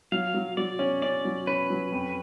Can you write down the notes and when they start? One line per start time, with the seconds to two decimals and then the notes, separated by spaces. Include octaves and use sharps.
0.12 F#3 F5
0.34 F#3
0.57 F#3 D5
0.79 C#4
1.02 C#4 D5
1.25 F#3
1.47 C#4 B4
1.70 F#3
1.92 F2